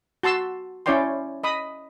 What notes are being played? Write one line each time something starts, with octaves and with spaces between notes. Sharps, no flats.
F#4 A5 C6 E6
C#4 E4 C#5 D5 G5 C6
D#5 B5 D#6